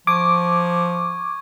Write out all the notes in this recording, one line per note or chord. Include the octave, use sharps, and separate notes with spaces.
F3 C#6 D6 G#6